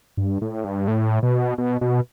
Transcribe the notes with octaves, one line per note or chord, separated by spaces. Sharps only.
G2
A2
G2
A2
B2
B2
B2